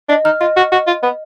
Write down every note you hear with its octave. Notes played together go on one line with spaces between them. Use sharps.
D4 D#5
D#4 F6
F4 D#5
F#4 F6
F#4 D#5
F4 D#5
B3 D#5